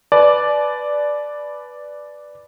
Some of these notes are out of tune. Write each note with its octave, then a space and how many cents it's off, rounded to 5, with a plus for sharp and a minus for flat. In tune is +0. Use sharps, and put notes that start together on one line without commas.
B4 +0 D5 +0 A5 -45